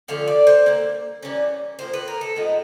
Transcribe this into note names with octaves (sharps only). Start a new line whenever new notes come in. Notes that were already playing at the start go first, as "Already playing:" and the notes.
D3 F3 A3 C#4 F5
D5
C5
D3 G3 A#3
E3 G3 A#3 C#4
A2 F3 A#3 C5
B4
A#4
A4
A2 F3 G#3 B3 D#4